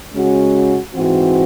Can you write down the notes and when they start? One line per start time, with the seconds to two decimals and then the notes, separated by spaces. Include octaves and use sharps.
0.13 C#3 G#3 C#4 F#4
0.94 G#2 E3 C4 F#4